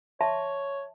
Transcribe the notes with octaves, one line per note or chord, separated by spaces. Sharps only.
C#5 E5 A5 C6